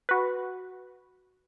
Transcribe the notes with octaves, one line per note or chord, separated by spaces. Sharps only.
F#4 B4